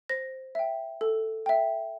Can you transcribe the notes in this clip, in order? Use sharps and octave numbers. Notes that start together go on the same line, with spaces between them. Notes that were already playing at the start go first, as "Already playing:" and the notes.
C5 A#6
E5 G5
A4
E5 G5